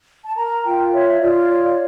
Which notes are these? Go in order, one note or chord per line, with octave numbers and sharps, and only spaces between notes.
A5
A#4 A#5
F4 G5
C#5 E5
F4 D5
C#5
D5